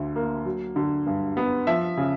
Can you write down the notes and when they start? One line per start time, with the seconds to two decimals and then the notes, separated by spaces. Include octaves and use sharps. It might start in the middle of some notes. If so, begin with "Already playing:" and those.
Already playing: D2 D3
0.16 A#3
0.45 F#3
0.76 D3
1.06 G2
1.37 B3
1.67 F3 E5
1.97 C#3